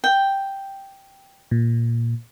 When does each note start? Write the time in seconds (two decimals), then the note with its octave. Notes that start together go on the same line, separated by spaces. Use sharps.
0.04 G5
1.51 A#2